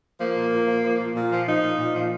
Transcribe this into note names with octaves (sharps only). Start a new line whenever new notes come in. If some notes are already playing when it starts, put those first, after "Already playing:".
F3 A#3
A#2
A#2
F3
F3
A#2
A#2
F3
F3 D#4
A#2
A#2
F3